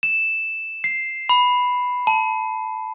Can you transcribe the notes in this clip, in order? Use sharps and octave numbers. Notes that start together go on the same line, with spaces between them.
E7
C7
B5
A5